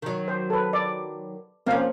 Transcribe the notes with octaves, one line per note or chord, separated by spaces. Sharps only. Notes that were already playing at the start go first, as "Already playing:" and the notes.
D#3 F#3
C5
A4 B4
D5
F3 A#3 C4 C#4 F5